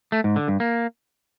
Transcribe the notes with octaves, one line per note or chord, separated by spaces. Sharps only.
A3
G#2
D3
G2
A#3